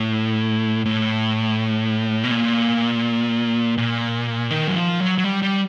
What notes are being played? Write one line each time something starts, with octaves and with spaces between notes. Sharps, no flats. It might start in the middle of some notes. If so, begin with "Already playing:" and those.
Already playing: A2
A2
B2
A#2
A#2
D#3
F#3
F3
F#3
F#3
G3
G3